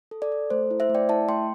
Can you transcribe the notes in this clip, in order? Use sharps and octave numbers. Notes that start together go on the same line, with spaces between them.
A4
A4 D5
A4
A3 C5
E4
C5 E5
A3
D5 G5
E4 E5 A5
A3 G5 C6